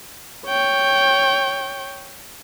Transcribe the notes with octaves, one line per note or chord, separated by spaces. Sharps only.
C#5 G5